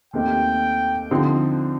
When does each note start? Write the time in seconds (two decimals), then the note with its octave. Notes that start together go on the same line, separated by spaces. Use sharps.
0.13 D#2 D#3 A3 C4 G4 G5
1.11 D3 F3 C4 D#4